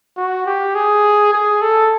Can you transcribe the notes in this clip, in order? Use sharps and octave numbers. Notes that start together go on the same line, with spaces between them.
F#4
G4
G#4
G#4
A4